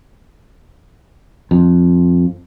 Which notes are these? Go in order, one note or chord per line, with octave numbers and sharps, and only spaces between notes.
F2